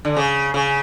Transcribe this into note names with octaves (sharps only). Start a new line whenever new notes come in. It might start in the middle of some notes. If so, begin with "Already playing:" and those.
D3
C#3
C#3